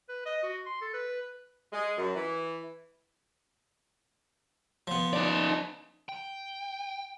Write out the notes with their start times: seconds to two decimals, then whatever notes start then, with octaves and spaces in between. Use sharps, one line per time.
0.09 B4
0.25 D#5
0.43 F#4
0.66 C6
0.81 A4
0.94 B4
1.73 G#3
1.97 F#2
2.15 E3
4.87 F3 B3
5.13 D#4 D5
6.09 G5